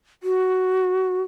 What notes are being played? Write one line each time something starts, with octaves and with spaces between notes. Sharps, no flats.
F#4